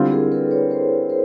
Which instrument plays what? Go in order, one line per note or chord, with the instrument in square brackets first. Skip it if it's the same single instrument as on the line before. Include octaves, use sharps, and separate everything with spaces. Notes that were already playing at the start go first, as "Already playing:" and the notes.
Already playing: [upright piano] D3 G3 C4 F4 [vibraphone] E4
[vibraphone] G#4 A#4
A4 B4
B4 C#5
A#4 C5
A#4 C5